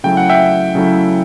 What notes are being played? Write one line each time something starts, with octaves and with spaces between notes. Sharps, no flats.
C#3 F#3 A3 E4 G5
F#5
E5 G5
C#3 F#3 A3 E4